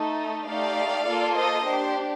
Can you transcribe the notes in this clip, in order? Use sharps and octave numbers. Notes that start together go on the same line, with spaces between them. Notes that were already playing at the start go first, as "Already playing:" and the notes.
Already playing: A3 D#4 A4
A3 D#4 G4 D5 F5
A#3 F4 A4
C5 D#5
D4 G4 C5